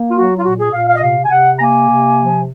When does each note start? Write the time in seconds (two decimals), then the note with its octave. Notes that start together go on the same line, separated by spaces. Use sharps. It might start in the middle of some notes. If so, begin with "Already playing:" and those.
Already playing: A#3
0.09 F4
0.14 F#3 F#4
0.37 F4
0.44 A#2 F#4
0.58 G#4
0.72 A#2 F5
0.87 F5
0.94 D#5
1.01 C3 F5
1.24 G#5
1.30 C3 F#5
1.55 A#5
1.59 A#3 G#5
1.89 C3
2.19 F3